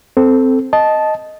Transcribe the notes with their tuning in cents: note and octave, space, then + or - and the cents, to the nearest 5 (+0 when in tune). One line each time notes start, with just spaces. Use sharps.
C4 -5 A4 +0
D#5 +0 A5 -10